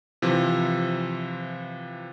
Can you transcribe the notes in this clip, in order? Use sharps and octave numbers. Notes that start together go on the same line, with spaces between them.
C3 E3 F3